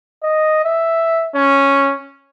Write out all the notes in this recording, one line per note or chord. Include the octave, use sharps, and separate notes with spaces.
D#5
E5
C#4